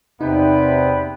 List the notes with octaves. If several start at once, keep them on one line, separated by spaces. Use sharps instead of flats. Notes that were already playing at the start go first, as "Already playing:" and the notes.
E2 C3 B3 D#4 B4 G5